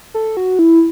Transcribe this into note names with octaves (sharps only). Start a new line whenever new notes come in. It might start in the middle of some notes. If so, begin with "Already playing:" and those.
A4
F#4
E4